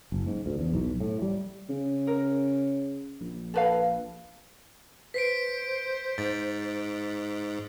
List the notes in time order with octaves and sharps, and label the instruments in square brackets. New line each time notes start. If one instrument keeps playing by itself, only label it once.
[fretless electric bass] F#1
G#2
D2
E2
B1
A2
G3
[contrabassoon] C#3
[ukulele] A#4
[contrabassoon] A#1
[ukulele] A4 B4 F5
[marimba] B4 [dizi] C5 [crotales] B6 C7 D7
[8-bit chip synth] G#2 [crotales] A6